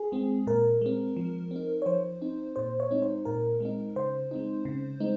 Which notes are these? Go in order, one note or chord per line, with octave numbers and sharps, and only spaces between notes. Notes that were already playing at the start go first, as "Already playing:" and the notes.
Already playing: G#4
G#3 C4
A#2 A#4
G#3 C4
F3
C4 D#4
C#5
F3 C5
C4 D#4
A#2 C5
C#5
G#3 C4 D#4
C5
A#2 A#4
G#3 C4 D#4
C#3 C5
G#3 C4 D#4
C#3
G#3 C4 D#4